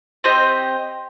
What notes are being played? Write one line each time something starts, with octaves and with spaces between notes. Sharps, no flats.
C4 G4 D#5